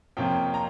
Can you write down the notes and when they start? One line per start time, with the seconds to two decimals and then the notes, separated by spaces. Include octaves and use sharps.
0.17 F2 C3 F3 A#3 C#4 G5
0.54 A#5